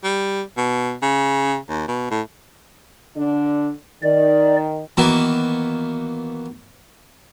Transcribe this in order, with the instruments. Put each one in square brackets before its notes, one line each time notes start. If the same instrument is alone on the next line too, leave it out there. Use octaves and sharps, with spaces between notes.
[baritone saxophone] G3
B2
C#3
D#2
B2
A2
[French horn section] D3 D4
[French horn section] D#3 [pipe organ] D5
[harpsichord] D#3 E3 A#3 B3 F#4